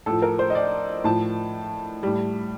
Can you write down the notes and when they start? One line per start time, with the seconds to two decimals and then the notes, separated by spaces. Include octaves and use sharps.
0.06 A2 F3 A4
0.22 A#4
0.39 C5
0.50 D#5
0.55 D5
1.04 A2 F3 A5
2.03 A2 G3